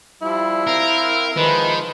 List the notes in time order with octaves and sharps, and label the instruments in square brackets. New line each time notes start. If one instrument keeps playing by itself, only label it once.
[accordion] F3 G3 [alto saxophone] E4
[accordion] C4 F5 [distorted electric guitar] A#4
[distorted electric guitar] D#3 [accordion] F3 G#3 [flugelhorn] B4